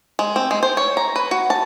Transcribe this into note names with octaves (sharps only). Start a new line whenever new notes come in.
G#3
C4
G#3
C5
C#5
A#5
B4
F#4
A5